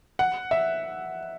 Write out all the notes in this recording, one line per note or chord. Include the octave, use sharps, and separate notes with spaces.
F#5
E5